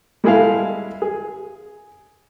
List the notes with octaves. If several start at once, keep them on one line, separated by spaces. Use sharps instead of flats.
G3 G#3 E4 G#4 A4 F5
G#4